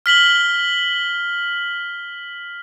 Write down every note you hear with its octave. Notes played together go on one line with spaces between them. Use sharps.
F6 B6 F#7 G7